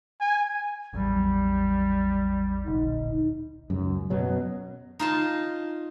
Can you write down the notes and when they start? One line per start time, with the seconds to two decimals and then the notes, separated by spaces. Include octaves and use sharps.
0.20 G#5
0.93 A1 E2 F#3 G3
2.66 D1 A#1 D3 D#4
3.70 C#2 F#2
4.10 F#2 B2 F#3
4.99 D#4 F4 A5